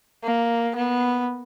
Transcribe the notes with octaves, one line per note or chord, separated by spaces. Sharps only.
A#3
B3